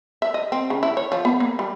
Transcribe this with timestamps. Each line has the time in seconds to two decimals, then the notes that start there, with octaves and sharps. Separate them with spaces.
0.22 E5
0.34 D#5
0.52 C4
0.70 C#3
0.83 E4
0.97 C#5
1.12 F3
1.25 B3
1.40 A#3
1.59 G3